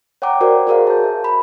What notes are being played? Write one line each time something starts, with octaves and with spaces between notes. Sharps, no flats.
C#5 F#5 G5 A#5 D6
F#4 A#4 C5 D5
F#4 G#4 A#4 C5 F5
A5 G6
E5
B5